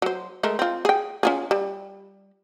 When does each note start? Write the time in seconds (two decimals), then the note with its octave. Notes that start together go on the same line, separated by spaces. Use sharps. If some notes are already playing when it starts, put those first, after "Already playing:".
0.02 F#3 C5
0.43 G#3 A3 A#4
0.59 C4 F4
0.85 G#4 G5
1.23 C#4 F4 G#4
1.51 G3